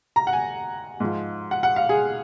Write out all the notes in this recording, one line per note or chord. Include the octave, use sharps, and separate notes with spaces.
A#5
F#5
G#5
G#2 F3
F#5
F#5
F5
G#4